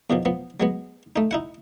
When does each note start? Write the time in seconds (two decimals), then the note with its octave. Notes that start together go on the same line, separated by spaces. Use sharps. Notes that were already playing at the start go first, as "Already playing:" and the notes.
0.10 E2 B2 D#3 F3
0.25 F3 B3
0.60 F#3 G#3 B3
1.16 A3 D#4
1.31 D#4 E4 F#5